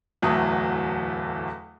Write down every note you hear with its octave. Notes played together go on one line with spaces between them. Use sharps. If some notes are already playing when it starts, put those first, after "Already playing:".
D1 E2 F#3 A3 A4 D#6